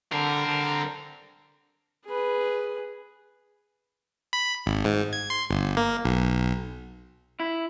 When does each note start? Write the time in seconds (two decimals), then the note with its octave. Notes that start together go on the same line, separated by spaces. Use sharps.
0.12 D3 G3 C4 A#4
0.46 D3
2.06 G#4 B4
4.33 B5
4.66 G#1
4.85 G#2
5.13 G#6
5.30 C6
5.51 G1
5.77 A#3
6.05 B1
7.40 E4